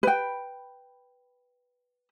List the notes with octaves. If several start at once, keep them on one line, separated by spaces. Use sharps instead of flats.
B4 G5